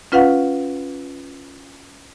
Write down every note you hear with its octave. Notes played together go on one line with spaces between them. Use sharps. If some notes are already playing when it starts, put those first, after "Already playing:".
C#4 F4 B4 F5 F#5